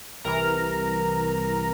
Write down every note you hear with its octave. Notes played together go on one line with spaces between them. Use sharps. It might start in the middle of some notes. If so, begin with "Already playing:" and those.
C2 C3 E3 A#4 A#5